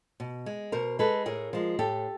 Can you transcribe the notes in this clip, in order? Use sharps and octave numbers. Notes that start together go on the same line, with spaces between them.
B2
G#3
B2 A#4 C5
G#3 A4 B4
A2 G#4 A#4
F3 G#3
A2 G4 A4